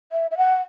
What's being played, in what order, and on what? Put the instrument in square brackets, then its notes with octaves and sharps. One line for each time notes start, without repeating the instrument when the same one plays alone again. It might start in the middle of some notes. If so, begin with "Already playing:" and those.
[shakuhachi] E5
E5
F#5